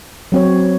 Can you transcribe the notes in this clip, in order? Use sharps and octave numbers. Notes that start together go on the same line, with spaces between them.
F#3 C4 F#4 C#5